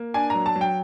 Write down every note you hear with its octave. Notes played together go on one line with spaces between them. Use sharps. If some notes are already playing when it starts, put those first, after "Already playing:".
Already playing: A#3
D4 G#5
F#3 A#5
A5
F#3
G5